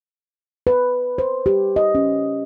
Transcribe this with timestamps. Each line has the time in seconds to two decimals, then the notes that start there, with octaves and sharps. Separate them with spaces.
0.67 B4
1.18 C5
1.46 G4
1.76 D#5
1.95 C#4